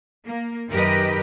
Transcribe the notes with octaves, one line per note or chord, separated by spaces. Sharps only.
A#3
F#2 D#3 G4 A#4 B4 D#5